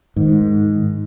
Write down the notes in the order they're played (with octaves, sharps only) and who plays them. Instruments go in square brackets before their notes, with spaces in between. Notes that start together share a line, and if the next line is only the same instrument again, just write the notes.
[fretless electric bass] G#2 [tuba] D#3